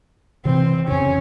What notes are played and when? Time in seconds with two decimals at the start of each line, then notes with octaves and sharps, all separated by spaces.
0.45 C3 E3 C4
0.88 F2 C#3 C#4